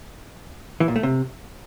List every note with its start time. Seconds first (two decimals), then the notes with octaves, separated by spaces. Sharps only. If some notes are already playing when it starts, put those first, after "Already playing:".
0.80 E3
0.88 A#2
0.96 A3
1.03 C3